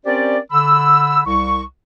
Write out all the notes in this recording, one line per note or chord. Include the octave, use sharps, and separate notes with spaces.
C4 C#4 G4 A#4 C5 D5
D3 B5 E6
C2 C#6